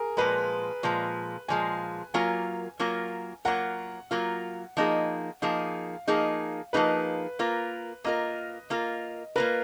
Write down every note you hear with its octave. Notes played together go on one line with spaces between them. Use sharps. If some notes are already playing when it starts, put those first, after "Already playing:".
Already playing: G#4 A#4
A#2 F3 G#3 B4
A#2 F3 G#3
A#2 F3 G#3 G#5
F#3 A#3 F4 A#4 G#5
F#3 A#3 F4 A#4
F#3 A#3 F4 A#4 F#5
F#3 A#3 F4 A#4
F3 A#3 D#4 G#4
F3 A#3 D#4 G#4 F5
F3 A#3 D#4 G#4
F3 A#3 D#4 G#4 B4
A#3 F4 A#4
A#3 F4 A#4 D#5
A#3 F4 A#4
A#3 F4 A#4 B4